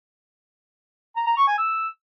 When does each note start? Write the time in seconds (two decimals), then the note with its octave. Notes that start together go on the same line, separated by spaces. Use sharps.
1.16 A#5
1.27 A#5
1.37 C#6
1.47 G#5
1.58 E6